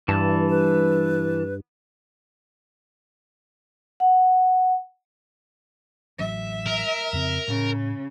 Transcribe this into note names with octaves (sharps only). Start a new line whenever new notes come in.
G2 E3 A5
B4
F#5
A1 F#3 E5
A#4
F2 C#3 C4
A2 C#3